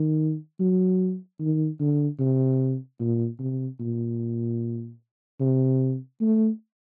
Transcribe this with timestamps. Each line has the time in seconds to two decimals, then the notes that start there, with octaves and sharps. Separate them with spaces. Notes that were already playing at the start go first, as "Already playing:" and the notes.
Already playing: D#3
0.60 F#3
1.40 D#3
1.80 D3
2.19 C3
3.00 A#2
3.39 C3
3.80 A#2
5.40 C3
6.21 A3